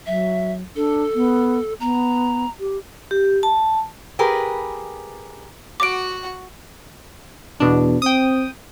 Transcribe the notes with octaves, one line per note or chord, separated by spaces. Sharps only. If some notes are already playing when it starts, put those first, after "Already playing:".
F#3 E5
D4 A4
B3
B3 A#5
G4
G4
A5
G4 G#4 A#4 B4
F#4 F#5 D6 D7
E2 B2 D4
C4 G5 D#6